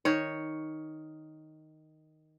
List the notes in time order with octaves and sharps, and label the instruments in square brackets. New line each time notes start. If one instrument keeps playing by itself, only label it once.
[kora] D#3 C#5